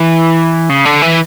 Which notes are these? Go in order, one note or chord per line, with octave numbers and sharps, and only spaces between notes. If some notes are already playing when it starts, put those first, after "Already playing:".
Already playing: E3
C#3
D3
E3